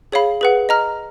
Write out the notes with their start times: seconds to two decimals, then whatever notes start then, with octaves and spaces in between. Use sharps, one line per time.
0.12 G#4 C#5 F5 B5
0.41 G#4 B4 F#5
0.69 D#5 A#5 F6